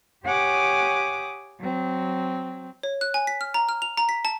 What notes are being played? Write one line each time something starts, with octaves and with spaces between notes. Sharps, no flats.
G4 C#5 F#5 G#5 D6 D#6
F#3 C4
C#5
F#6
G#5
B6
F6
A#5
F6
F7
A#5
B6
A5